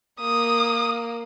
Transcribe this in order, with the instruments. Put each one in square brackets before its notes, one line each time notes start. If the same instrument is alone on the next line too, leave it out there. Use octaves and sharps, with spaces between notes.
[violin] A#3 [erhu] D#6